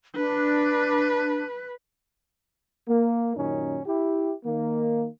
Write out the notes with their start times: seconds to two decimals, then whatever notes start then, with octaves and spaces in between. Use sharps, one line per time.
0.16 D4 B4
2.88 A#3
3.36 F#2 A#2 D#3 C#4 D#4
3.86 E4 G4
4.45 D#3 A#3